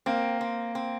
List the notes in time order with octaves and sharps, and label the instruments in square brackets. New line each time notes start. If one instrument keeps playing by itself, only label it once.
[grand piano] A#3 [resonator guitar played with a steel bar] C4
[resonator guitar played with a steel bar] C4
C4